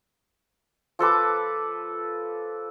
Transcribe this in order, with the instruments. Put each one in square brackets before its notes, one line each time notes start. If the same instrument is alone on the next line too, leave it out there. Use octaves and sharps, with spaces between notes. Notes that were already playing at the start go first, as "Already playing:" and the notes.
[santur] F3 A4 B4 D6